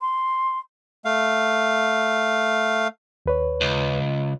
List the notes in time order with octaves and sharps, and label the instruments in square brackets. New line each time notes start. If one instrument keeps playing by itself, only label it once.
[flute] C6
[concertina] A3 F5
[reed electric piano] D#2 B4 C#5
[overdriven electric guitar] C#2